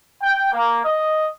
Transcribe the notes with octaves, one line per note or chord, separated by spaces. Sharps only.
G5
A#3
D#5